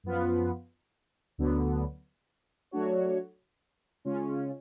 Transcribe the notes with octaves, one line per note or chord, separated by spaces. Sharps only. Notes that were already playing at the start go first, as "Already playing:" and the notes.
F#2 F3 B3 F4 B4
D2 D3 F#3 B3
F#3 A3 D4 F#4 C#5
C#3 G#3 C#4 F4